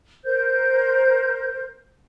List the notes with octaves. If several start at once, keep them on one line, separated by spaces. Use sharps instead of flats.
A#4 C5 G6